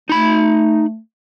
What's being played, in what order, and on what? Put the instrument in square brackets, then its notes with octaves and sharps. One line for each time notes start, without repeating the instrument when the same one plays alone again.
[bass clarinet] A3 [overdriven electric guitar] D#4 B5